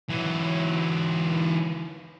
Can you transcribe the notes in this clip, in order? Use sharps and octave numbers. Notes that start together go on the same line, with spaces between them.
E3 F#3